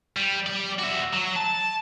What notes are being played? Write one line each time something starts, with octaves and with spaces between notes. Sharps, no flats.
G3
G3 D5
F#4 E5
F#3
A5